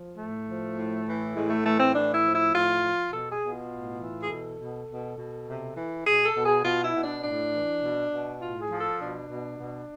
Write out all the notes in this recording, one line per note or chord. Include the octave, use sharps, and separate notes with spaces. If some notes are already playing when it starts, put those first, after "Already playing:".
Already playing: F3
A2 A3
F3
A2
E3
A2 G#3
A3
E3 A3
C4
A2 D4
E4
F3
E4
A2 F4
F3
B2 A4
G#4
B2
F4
A2
E3
G#4
B2 A4
B2
B2
B2
C3
E3
B2 G#4
A4
B2
G#4
B2 F4
E4
B2
D4
A2 D4
E3
B2
B2
A2 F4
G#4
F3
A4
B2 D4
B2
B2